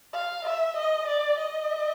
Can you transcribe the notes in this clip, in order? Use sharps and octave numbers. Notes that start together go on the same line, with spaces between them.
F5
E5
D#5
D5
D#5